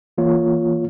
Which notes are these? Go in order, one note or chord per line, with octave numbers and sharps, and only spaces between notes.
E3 A#3 F4 C#5